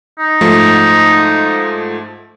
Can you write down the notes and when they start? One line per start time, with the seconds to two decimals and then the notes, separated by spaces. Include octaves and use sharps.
0.19 D#4
0.41 G#2 F3 A3